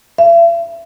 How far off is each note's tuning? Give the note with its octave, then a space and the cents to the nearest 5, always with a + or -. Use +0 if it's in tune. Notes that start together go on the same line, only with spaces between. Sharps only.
E5 +40